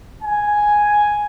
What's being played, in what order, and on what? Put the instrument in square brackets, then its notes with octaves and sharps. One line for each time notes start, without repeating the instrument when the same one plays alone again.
[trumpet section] G#5